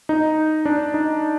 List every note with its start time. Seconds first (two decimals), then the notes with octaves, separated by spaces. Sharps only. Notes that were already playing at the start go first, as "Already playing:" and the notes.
0.09 D#4
0.66 D4
0.94 D#4